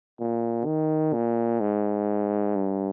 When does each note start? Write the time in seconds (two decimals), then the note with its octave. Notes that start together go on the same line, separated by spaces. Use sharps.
0.20 A#2
0.66 D#3
1.14 A#2
1.60 G#2
2.55 G2